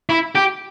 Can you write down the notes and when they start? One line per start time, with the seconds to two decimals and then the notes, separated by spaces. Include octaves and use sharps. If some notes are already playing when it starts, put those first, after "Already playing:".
0.09 E4
0.36 G4